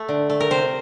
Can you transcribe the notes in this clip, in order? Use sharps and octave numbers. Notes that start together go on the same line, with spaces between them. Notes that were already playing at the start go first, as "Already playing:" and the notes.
Already playing: A3
D3
A3
A#4
C3 C5